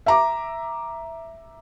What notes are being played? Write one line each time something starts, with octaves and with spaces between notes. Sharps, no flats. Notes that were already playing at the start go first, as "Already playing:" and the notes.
E5 A#5 D6